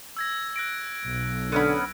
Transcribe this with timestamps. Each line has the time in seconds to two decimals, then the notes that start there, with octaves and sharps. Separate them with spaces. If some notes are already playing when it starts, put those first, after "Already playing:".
0.17 E6 G#6 A#6
0.56 F#6 A#6 D7
1.04 B1
1.52 D3 B3 C#4 B5